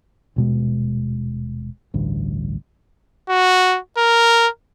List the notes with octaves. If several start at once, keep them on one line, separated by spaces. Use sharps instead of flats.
D#1 B2 G#3
A1 D2 G2
F#4
A#4